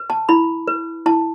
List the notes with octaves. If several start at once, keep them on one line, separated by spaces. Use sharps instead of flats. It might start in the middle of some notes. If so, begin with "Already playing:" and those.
Already playing: B4
A5
E4 B5
B4
E4 A5